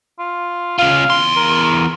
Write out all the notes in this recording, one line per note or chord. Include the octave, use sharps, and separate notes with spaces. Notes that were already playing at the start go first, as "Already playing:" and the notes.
F4
C#3 F4 F5
E2 C6
A#4